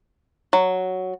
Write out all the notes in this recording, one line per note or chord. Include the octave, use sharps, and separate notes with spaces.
F#3